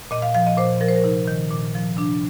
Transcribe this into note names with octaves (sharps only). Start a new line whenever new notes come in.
A#2 D#5
F5
F3 F5
D#5
A#2 C5
F3 A#4
C5
A#4
C3 D#4
D#3
A#2
F3
C3 D4